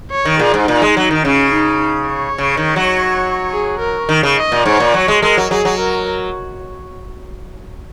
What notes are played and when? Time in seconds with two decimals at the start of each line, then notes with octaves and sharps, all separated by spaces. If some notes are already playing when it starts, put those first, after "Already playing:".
0.11 C#5
0.25 D#3
0.39 A#2 G#4
0.54 G#2
0.68 A#2 D#4
0.82 G#3
0.97 F#3
1.11 D#3
1.25 C#3 C#4
1.53 D#4
2.10 C#5
2.38 C#3
2.57 D#3
2.76 F#3
3.52 G#4
3.80 A#4
4.09 D#3
4.23 C#3
4.38 D#5
4.52 A#2
4.66 G#2 C#5
4.80 A#2
4.94 F#3 C#5
5.08 G#3
5.22 G#3 A#4
5.37 F#3
5.51 F#3 G#4
5.65 F#3
5.79 A#4